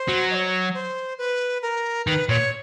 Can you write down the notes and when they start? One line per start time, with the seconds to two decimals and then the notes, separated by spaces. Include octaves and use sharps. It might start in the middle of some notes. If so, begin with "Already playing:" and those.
Already playing: C5
0.08 F#3
0.30 D#5
0.35 C#5
0.74 C5
1.18 B4
1.62 A#4
2.07 D#3 B4
2.29 A#2 C#5